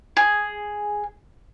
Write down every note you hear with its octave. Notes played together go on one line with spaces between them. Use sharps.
G#4